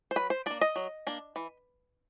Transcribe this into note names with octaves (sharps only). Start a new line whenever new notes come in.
C5
F#3 B4
C5
A#3 D4 D5
D#5
F#3
A#3 D4
E3